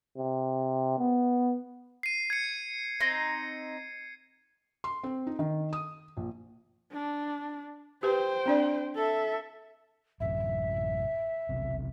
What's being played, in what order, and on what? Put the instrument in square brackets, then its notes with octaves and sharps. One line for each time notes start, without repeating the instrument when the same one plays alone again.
[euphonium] C3
B3
[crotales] C7 D#7
G#6 C#7
[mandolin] C4 D#4
[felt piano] C6
C4
D#4
D#3
D#6
A#1
[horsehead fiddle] D4
[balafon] G4 B4 [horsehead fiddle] C5 G5
[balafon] C4 D4 D5
[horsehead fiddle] A4 E5
[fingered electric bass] A1 F#2 C3 [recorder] E5
[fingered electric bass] E1 B1 C3